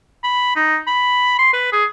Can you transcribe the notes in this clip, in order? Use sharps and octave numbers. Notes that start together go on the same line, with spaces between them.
B5
D#4
B5
C6
B4
G#4